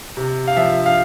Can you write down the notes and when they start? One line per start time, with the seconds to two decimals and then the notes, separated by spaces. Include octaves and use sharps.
0.17 C3
0.47 F5
0.57 F3 E5
0.86 F5